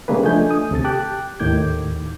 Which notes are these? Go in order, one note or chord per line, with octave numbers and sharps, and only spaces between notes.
C#3 G3 A3 A#3 G#4 B4
F3 A3 D4 D#5 G#5 G6
D#6
D2 C3 A4 A6
G4 G5 A5 D6 F#6
D#2 A2 D#3 D6 G6 G#6